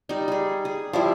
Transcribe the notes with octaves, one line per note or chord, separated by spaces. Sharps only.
G3 D#4
G3 G#4
G#4
F3 G3 E4